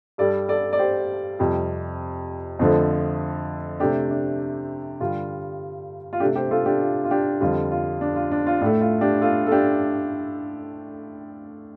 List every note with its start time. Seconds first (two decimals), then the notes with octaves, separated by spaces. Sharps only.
0.18 G2 G3 A4 D5
0.48 A4 D5
0.73 D5
0.79 G4 C5
1.39 F2 C3 G3
2.59 F2 D3 F3 A3
3.80 C3 A3 D4 G4
4.10 D4
5.01 G2 D3 G3 F4
6.13 F4
6.20 C3 A3 D4 G4
6.36 G4 C5
6.51 F4 A4
6.66 D4 G4
6.81 F4
7.05 F4
7.11 D4 G4
7.41 F2 D3 G3 F4
7.71 F4
8.01 D4
8.16 F4
8.31 D4
8.47 F4
8.61 A2 A3 D4
8.81 F4
9.01 D4 G4
9.21 F4 A4
9.47 A4
9.52 D4 G4